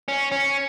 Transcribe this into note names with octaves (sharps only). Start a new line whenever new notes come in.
C#4
C#4